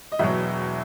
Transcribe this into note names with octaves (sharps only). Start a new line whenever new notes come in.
D#5
E1 E2 B2 F#3 E5